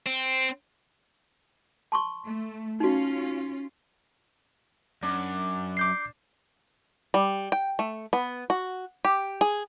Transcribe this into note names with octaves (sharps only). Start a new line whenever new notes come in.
C4
A5 C6 C#6
A3
C#4 D#4 F4 F#4
F#2 D4
D6 G6 C7
G3
G5
A3
B3
F#4
G4
G#4